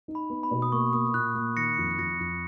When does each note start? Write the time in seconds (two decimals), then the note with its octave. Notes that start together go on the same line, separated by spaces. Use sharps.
0.08 D#4
0.15 B5
0.30 B3
0.43 B5
0.51 B2
0.62 D#6
0.72 A#3 C#6
0.93 A#3 D#6
1.14 A#2 F#6
1.35 A#3
1.57 D#3 A#6 C#7
1.78 F2
1.99 F2 A#6 C#7
2.20 F2